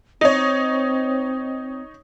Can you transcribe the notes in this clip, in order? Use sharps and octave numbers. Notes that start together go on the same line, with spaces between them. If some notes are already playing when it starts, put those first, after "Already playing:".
C4 D#4 C#5